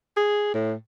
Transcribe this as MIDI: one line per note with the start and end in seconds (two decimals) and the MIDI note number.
0.17 0.53 68
0.54 0.73 45